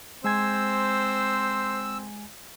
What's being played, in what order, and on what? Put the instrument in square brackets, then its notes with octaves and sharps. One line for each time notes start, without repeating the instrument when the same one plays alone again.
[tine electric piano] G#3 G#5 G#6 [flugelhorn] C4 [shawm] C5 [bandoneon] E6